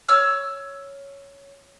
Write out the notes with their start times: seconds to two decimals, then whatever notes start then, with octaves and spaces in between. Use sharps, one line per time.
0.09 C#5 E6 F6